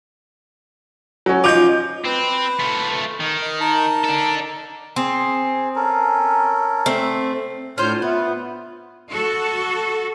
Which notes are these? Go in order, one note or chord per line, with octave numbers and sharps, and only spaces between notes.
F#3 C#4
F3 D#4 D6 G6
C4 B4
A3 F4
D#3
D#5
D#4 A#4 A5
D4 A4
C4 G#4
C#4 A4 A#4
A3 C4
A2 C#4 D4 F4 C5 F6 G6
B3 B4 E5
F#4 A4